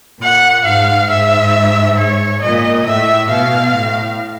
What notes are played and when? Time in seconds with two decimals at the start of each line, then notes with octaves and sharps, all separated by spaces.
0.21 A#2 F#5
0.66 G#2 F5
1.10 G#2 E5
1.98 C#5
2.42 A#2 D#5
2.86 A2 E5
3.30 B2 F5
3.74 A2